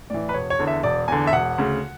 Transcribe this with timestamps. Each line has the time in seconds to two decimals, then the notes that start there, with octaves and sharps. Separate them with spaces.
0.10 A2 E3 D5
0.29 B4
0.34 E1 C#5
0.50 C#5
0.59 E2 D3
0.67 E5
0.83 E1 D5
1.08 E2 D3 G#5
1.27 E5
1.32 E1 F#5
1.58 D2 C#3